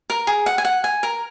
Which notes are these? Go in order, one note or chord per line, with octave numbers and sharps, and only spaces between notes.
A#4
G#4
F#5
G#5
F#5
G#5
A#4